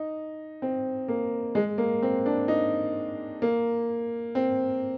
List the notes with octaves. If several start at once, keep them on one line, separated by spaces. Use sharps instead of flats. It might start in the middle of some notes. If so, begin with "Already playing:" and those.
Already playing: D#4
C4
A#3
G#3
A#3
C4
D4
D#4
A#3
C4